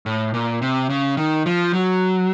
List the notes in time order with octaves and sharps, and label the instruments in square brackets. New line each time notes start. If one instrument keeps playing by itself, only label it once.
[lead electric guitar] A2
A#2
C3
C#3
D#3
F3
F#3